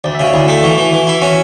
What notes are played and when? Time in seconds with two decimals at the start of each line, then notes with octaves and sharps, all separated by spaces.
0.04 D2 D5
0.15 E5
0.20 C#3 F#4
0.34 D2 E4
0.48 A3
0.63 E3 F#4
0.78 E3
0.93 E3
1.07 E4
1.22 C#4 F#4